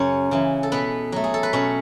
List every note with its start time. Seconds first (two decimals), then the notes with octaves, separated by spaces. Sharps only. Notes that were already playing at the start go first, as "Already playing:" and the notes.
Already playing: F#2 C#3 C#4 C#5
0.31 C#3 E3
0.63 A4
0.72 B2 B3 B4
1.12 F#3 A3
1.24 G#4
1.34 A4
1.43 B4
1.53 B2 C#4 C#5